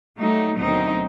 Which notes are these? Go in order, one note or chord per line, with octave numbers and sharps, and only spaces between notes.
F#3 G3 A3 D#4
D2 B2 D#3 F#3 C4 D#4